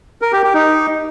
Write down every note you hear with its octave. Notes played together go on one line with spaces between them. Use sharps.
A#4
G4
G4
D#4